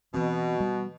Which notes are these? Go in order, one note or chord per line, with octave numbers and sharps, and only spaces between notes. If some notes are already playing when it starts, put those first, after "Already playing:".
B2 E3 C4
G3